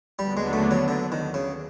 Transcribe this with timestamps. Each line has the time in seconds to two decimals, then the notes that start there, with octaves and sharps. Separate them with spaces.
0.19 D#2 D3 F#3 G3 B3 D4
0.37 G#3
0.53 A3
0.71 F#3
0.88 D3
1.12 D#3
1.34 C#3